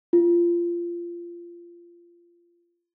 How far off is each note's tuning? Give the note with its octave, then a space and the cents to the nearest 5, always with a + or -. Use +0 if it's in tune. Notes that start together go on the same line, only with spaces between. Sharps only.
F4 -20